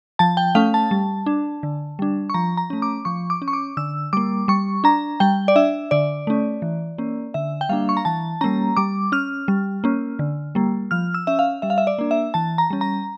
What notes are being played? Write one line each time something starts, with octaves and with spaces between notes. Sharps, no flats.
F3 A5
G5
A3 C#4 F5
A5
G3
D4
D3
G3 D4
C#6
F3 A#5
A#5
A3 C#4
D6
F3 C#6
D6
C#4
C#6
D6
D3 E6
G3 A#3 D6
G3 C#6
D4 A#5
G3 G5
D5
D4 E5
D3 D5
A3 C#4
E3
A#3 C#4
D3 E5
G5
G3 A#3 D4 F5
C#6
A#5
E3 A5
G3 A#3 C#4 A#5
G3 D6
C#4 F6
G3
A#3 C#4
D3
G3 A#3
F3 F6
E6
C#4 E5
F5
G3 E5
F5
E5
D5
A#3 D4
E5
E3 A5
A#5
G3 C#4
A#5